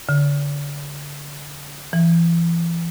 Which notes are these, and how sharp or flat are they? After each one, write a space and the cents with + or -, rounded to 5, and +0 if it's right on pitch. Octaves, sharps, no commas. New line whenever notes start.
D3 -30
E3 +35